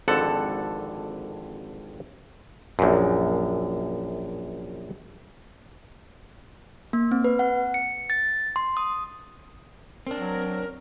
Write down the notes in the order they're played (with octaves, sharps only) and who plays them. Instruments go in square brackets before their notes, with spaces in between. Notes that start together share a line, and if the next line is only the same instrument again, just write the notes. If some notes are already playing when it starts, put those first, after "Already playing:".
[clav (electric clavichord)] G#1 F2 D3 A4 F#5 A5
A#1 F#2
[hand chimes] A#3
C4
B4
F#5
C#7
A6
C6
D#6
[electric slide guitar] C4 D4 [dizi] A#4
[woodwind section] F#3